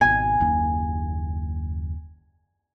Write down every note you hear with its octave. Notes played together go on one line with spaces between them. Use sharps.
G#1 B2 G#5
F#1 D#2 A#3